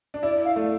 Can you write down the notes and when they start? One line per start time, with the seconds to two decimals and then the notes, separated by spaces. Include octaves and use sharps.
0.14 D4
0.23 E4 D5
0.45 F5
0.56 A3